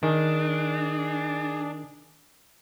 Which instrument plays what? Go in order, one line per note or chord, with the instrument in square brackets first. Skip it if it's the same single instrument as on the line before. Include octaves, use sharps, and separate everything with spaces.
[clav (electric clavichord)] D#3 [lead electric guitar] D4 [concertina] G#4